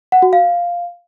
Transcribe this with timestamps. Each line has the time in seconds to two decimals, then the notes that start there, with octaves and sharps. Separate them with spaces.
0.12 F#5
0.22 F#4
0.33 F5